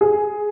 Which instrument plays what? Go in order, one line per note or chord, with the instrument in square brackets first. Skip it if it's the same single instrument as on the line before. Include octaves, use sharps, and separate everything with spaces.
[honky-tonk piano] G#4